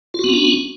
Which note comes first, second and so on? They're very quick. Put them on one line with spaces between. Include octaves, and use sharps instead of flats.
F4 F#4 B3 C#4 D4